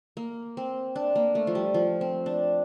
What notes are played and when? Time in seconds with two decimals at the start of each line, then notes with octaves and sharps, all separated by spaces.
0.17 A#3
0.57 C4
0.96 D4
1.15 A#3
1.35 A3
1.47 F3
1.55 G3
1.74 F3
2.01 C4
2.26 D4